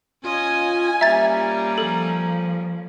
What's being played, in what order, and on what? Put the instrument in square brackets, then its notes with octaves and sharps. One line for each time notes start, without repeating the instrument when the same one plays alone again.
[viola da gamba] C#4 D#5 [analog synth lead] F4 [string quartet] G#5
[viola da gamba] G3 A#3 C#4 [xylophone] E5 A6 [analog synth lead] A#5
[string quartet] F3 [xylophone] A4